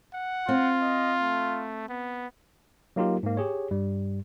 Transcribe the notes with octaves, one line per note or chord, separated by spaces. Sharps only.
F#5
C4 F4
D#5
A3
B3
F#3 A#3 D#4 F4 G4 A#4
G#2 A#3
G4 G#4 C#5
G2 G3